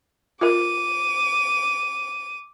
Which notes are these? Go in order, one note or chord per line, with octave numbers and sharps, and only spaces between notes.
F4 A#4 D6 D#7